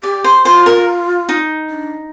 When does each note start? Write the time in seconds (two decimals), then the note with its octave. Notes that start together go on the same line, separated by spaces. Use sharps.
0.03 G4 D5
0.24 C5
0.45 F4 C5
0.66 A#4
1.29 D#4
1.70 D4